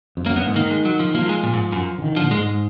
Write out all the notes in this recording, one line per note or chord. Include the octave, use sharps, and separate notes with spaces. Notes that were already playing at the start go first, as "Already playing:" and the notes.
F2
F#2 A#3
F#2 B3
G#2
D#3 A#3
G#3
F#3
F3
F3 A#3
F#3
G#3
A#2
G#2
F#2
D3
D#3
D3
F3
A#2
G#2 G#3